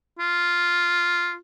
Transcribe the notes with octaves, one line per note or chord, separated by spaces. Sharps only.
F4